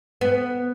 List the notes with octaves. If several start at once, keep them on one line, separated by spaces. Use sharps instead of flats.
B3